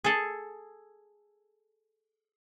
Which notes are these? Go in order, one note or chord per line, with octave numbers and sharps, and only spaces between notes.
G#4 A4